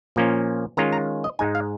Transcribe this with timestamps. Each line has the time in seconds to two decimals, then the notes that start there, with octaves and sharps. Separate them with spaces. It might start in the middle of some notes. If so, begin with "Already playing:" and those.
0.16 A#2 F3 A#3 C#4
0.77 D#3 G#3 C#4 F4 A#5
0.93 A#5
1.24 D#5
1.39 G#2 G#3 D#4 G#5
1.55 F5